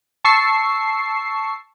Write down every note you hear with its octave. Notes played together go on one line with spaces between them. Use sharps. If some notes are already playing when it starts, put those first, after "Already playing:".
A5 C#6 E6 C7